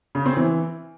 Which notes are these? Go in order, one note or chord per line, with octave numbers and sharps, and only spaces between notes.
C#3
C4
E3